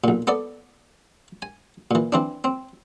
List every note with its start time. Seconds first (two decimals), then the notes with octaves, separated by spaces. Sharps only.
0.04 B1 A#2
0.27 B3 A4 D5
1.42 G#5
1.91 A#2 E3
2.12 E3 C4 D4
2.44 C4